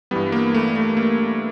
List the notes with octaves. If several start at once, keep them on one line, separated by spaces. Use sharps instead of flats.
G2 E3 G3 B3
A#3
A3
A3
A#3